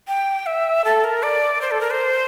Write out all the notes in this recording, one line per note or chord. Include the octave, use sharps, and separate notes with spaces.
G5
E5
A4
A#4
D5
C5
A4
A#4
C5